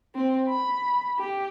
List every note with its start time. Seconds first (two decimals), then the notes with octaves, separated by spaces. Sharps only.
0.15 C4
0.49 B5
1.19 G4